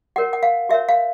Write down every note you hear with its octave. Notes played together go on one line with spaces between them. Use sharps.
F#4 A#4 C#5 F#5
F#5
F5
F#4 A#4 C#5 E5
F5